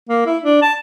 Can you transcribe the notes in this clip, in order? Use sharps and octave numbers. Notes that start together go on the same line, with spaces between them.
A#3
E4
D4
A5